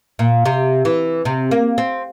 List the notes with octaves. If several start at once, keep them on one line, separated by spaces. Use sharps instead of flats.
A#2
C3
E3
C3
A#3
C4